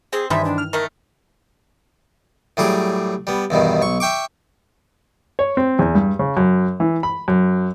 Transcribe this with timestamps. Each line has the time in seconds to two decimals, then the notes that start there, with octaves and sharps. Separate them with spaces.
0.13 C4 G#4
0.30 G2 C3 D#3 E3 G3 G#3 E5
0.45 D4
0.58 F6
0.73 D#3 A3 A#4
2.57 A2 F#3 G3 G#4 D6
3.27 G3 B3
3.50 E2 G2 B2 D#3
3.82 B1 C#6
4.00 E5 G5 C#6 D6
5.39 C#5
5.57 C4
5.79 E2
5.95 G2
6.19 C#3
6.37 F#2
6.80 E3
7.03 B5
7.28 F#2